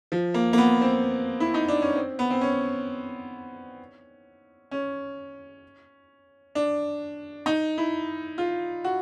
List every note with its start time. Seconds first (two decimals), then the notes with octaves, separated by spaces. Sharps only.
0.12 F3
0.34 A#3
0.53 A#3
0.58 B3
0.81 C4
1.40 E4
1.54 D#4
1.68 D4
1.82 C#4
1.96 C4
2.19 B3
2.31 C4
2.41 C#4
4.71 C#4
6.55 D4
7.46 D#4
7.78 E4
8.38 F4
8.84 F#4